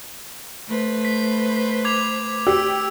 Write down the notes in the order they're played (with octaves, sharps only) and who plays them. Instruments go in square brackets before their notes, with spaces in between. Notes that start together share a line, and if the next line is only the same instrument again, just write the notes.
[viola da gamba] A3 B4 C5
[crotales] B6
D6 G#6 F7
[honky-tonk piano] G4 [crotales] E6